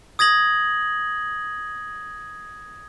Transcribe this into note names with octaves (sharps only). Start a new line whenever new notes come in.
D#6 G#6 A#6 F#7